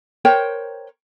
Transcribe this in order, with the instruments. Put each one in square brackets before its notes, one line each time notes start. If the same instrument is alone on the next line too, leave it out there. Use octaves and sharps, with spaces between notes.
[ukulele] A#4 C5 C#5 G5